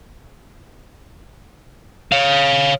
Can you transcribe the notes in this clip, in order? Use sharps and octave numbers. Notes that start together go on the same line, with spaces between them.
C#5 F5